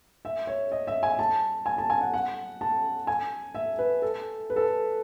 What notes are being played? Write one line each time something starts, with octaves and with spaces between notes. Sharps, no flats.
E5
C#5
D#5
E5
G#5
A5
G#5
A5
G#5
F#5
F#5
A5
G#5
E5
B4
A4
B4
A4